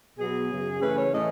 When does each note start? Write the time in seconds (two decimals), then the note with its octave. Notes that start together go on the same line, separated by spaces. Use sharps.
0.19 B2 F#3 B3 G#4
0.50 F#2 C#3 F#3
0.81 C#3 E3 A3 C#4 B4
0.97 C#5
1.12 A2 E3 A3 C#4 D#5